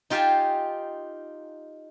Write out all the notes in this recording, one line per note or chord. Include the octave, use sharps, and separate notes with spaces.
D#4 F4 G4 F5 G#5 A5